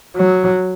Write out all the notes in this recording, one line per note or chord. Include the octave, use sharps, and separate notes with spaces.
F#3